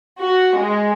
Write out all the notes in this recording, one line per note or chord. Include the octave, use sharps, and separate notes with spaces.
F#4
G#3